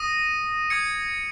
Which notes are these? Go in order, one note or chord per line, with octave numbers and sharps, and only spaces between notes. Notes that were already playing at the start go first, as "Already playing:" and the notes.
Already playing: D#6 A#6 D#7
D#6 G#6 C#7